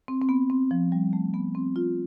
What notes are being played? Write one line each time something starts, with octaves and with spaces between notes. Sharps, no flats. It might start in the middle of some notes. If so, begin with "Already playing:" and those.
C4
C4
B3
C4
F3
G3
A3
B3
C4
F4